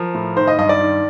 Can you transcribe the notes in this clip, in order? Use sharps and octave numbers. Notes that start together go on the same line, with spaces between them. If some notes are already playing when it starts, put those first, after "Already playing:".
Already playing: F3 A#4
A2
D#3 C5
D#5
G2 D#5
D5
D#3